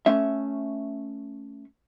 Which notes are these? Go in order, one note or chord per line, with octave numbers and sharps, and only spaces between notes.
A3 C#4 E5